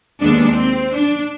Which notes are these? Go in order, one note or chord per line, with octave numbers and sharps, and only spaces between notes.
D#2 G#3 B3 D4
C4
D4